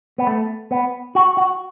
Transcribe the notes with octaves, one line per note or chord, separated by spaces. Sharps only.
B3
A3
B3
F#4
F#4